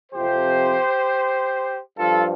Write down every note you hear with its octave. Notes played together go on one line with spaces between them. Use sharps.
F2 C3 F3 G4 C5
G2 F3 F4 A4